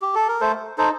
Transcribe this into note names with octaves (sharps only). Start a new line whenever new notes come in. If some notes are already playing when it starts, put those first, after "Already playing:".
G4
A4
A#4
A3 A4 C5
D#4 A4 C5